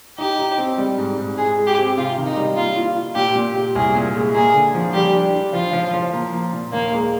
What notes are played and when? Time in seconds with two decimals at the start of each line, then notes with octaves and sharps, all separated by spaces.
0.18 D#4 G4
0.39 D#4
0.58 C4
0.78 G3
0.98 G#2
1.18 G#2
1.37 G#3 G#4
1.58 G#3
1.67 G4
1.77 C4
1.97 C3 F4
2.17 D#3
2.26 D#4
2.37 G3
2.56 A#3 F4
2.76 F4
2.96 F4
3.15 A#2 G4
3.35 A#2
3.55 G4
3.75 C2 G#4
3.95 A#2
4.15 G#3
4.34 A#3 G#4
4.54 D3
4.75 F3
4.94 G3 G4
5.14 D4
5.34 D4
5.53 F3 F4
5.73 F3
5.93 F3
6.13 A#3
6.32 A#3
6.53 A#2
6.72 D#2 A#3
6.93 G#3